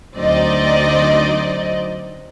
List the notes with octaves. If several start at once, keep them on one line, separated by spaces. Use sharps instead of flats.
D2 F#3 C4 D#4 D5 D#5